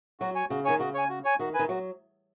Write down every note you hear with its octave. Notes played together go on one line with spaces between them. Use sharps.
F#3 F#4
C#5 G#5
C#3 F#4
D#3 C#5 G#5
C#3 F#4
C#5 G#5
F#4
C#5 G#5
D#3 F#4
B4 G#5
D#3
F#3 F#4